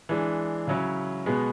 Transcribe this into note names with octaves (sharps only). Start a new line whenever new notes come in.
E3 G#3 D4
C#3 F#3 C#4 E4
B2 G#3 B3